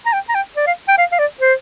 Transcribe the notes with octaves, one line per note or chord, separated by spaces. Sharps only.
A#5
G5
A#5
G5
D5
F5
G5
F5
F5
D5
C5